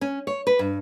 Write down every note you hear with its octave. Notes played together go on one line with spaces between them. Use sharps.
C#4
C#5
B4
G2